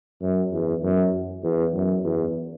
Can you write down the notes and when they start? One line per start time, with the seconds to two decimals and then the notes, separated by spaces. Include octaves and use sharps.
0.22 F#2
0.53 E2
0.83 F#2
1.43 E2
1.74 F#2
2.05 E2